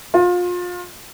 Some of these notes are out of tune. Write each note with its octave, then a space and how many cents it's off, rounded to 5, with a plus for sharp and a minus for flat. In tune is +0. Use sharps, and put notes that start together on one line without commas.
F4 +30